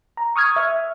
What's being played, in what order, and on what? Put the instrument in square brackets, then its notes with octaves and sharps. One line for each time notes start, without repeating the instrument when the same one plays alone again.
[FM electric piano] A#5
C#6 D#6 F6 G#6
E5